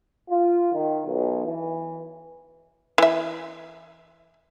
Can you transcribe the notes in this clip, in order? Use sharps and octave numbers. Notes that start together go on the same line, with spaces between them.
F4
D#3
B1
E3
E3 E5